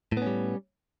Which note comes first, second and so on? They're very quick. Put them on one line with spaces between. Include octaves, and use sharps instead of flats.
A2 B3 C#4 G3